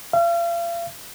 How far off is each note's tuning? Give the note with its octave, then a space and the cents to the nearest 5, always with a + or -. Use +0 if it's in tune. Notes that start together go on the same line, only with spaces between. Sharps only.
F5 -40